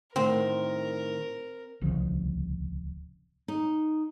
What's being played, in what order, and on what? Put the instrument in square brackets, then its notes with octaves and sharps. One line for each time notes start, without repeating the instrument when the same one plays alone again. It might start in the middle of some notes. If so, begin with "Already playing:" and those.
[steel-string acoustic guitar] A2 D#3 [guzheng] C4 [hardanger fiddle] A#4
[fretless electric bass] D1 C2 C#3 F3
[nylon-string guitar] D#4